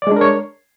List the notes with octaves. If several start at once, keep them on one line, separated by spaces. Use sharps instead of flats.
G#3 D4 A#4 C#5 D5